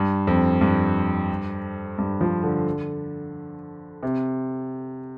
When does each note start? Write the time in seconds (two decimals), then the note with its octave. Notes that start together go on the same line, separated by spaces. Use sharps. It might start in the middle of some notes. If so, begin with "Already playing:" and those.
Already playing: G2
0.27 F2
0.61 G2
1.98 G2
2.21 F3
2.43 D3
4.03 C3